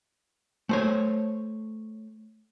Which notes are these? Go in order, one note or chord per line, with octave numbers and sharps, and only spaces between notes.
A3 C5 C#5